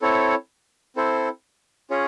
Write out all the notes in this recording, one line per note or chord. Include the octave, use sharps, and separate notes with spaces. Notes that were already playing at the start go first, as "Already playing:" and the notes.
C4 E4 A4 C#5
C4 E4 A4 C5
C#4 F4 G#4 C#5